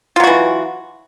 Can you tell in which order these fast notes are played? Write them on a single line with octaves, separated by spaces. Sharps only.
F4 F#3 F#4 E3